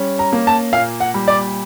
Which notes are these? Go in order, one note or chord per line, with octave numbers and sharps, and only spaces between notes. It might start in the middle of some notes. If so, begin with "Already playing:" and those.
Already playing: G3 C#4
A#5
A#3
A5
A#2 F5
F#5
G3
D5